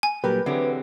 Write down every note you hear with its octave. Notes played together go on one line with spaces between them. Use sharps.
G#5
A#2 F#3 G3 G4 A#4 B4
D3 E3 F#3 C4 G4 G#4